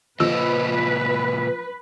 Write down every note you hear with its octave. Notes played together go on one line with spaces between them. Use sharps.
A#2 C#3 F3 B4 D#5 E6